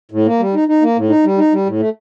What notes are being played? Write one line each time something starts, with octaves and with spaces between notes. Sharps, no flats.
A2
A#3
G3
D#4
D#4
A#3
A2
D#4
G3
D#4
G3
A2
A3